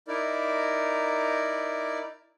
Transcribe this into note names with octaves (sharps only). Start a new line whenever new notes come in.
D#4 E4 A#4 D5